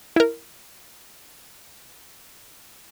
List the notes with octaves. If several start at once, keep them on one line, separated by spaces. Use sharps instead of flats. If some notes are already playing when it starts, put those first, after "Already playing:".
E4 A#4